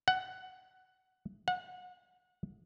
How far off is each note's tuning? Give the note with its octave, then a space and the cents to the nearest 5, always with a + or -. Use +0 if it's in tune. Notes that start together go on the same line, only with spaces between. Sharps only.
F#5 +10
F#5 -30